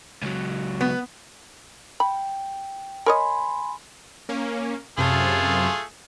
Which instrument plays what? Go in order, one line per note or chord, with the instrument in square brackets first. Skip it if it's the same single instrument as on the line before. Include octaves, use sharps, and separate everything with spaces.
[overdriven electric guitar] C#2 F#3
[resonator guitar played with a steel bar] B3
[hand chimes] G5 [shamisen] B5
[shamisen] A#4 C#5 D#5 [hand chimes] G#5 B5 C6
[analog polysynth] A#3 C#4
[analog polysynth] F#2 C3 A5 [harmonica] A3 F4 G#4